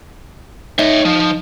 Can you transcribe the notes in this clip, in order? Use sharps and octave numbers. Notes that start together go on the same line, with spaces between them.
D#4 C#5 E5
F3